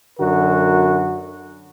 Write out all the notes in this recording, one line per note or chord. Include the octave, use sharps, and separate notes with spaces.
F#2 D3 F#4 A#4